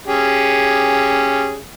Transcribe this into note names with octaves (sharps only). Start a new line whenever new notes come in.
C#4 G4 G#4